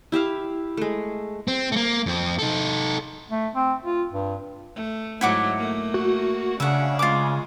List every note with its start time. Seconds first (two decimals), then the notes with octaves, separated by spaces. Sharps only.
0.12 E4 G4 E5 F5
0.77 G#3 A3
1.48 C4
1.72 A3 A#3
2.06 F2 C4
2.39 D#4 A4
3.31 A3
3.55 C4
3.85 F4
4.12 G2
4.75 A3
5.21 G#2 F#3 A3 E4 F#5 D6
5.57 A3 A#3
5.94 F#4
6.60 C#3 D4 E5 F#5
6.99 G#3 F4 D6